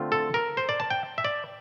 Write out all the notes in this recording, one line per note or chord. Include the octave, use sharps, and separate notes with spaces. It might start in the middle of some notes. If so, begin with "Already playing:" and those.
Already playing: D3 A3 C4 F4
A4
A#4
C5
D5
A5
G5
E5
D5